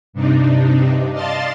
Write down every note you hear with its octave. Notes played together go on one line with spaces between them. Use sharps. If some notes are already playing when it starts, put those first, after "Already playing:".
G2 C3 D4 D#4
D5 D#5 F5 A5 C6 A6